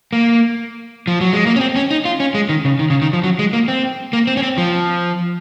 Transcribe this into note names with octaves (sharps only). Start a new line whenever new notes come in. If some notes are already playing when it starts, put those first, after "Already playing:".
A#3
F3
F#3
G#3
A#3
C#4
C4
C#4
D#4
F4
C#4
G#3
D#3
C#3
D#3
C#3
D#3
F3
F#3
G#3
A#3
C4
A#3
C4
C#4
C4
F3